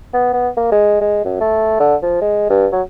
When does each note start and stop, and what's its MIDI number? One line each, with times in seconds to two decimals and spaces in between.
0.13 0.29 59
0.33 0.49 59
0.57 0.67 58
0.72 1.00 56
1.01 1.20 56
1.25 1.39 42
1.41 1.79 57
1.80 1.96 50
2.02 2.21 53
2.21 2.48 56
2.49 2.67 43
2.72 2.82 54